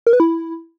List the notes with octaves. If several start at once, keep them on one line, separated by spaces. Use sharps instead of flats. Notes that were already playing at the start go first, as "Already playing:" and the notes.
A#4
B4
E4